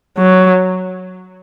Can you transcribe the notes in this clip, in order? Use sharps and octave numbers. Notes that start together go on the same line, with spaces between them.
F#3